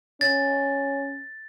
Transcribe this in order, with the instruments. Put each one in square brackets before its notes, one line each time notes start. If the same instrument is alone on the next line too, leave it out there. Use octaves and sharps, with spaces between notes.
[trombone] C#4 [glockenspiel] A6